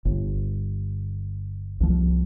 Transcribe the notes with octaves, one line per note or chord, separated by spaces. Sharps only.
G1
C2 F3